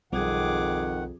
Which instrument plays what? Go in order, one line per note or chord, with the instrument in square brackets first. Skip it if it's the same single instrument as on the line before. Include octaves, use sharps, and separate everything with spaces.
[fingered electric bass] B1 G3 C4 [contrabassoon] F2 [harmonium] D#3 F#5 [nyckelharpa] G#4 D6